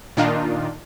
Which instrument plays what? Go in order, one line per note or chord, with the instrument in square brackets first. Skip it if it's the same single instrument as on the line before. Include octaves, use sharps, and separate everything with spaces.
[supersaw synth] A#2 D#3 D4 D#4 F4